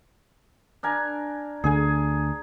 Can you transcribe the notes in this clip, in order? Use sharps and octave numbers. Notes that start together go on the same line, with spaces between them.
D4 A#4 G#5
D2 D3 G#4 G#5